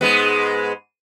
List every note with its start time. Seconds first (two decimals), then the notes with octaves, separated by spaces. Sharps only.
0.01 G#2 G#3 B3